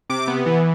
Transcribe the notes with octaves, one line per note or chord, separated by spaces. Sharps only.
C3 D6
B3
E3